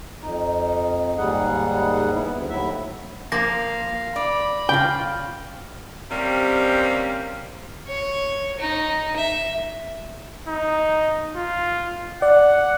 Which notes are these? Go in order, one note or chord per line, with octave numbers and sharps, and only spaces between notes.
F2 D#4
D#2 G#2 G3 D#4 G#4 F#5
B3 E4
D2
D#2 A2 F#3 E4 E5
F3 A#3 F5 A#6
D5 B5
C#3 F4 G5
C3 G3 A#3 C4 C#4
C#5
D#4
E5
D#4
F4
D5 F#5